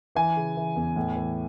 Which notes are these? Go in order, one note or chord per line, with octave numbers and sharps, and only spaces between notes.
E3 G#5
C#3
E3
E2
A2
E3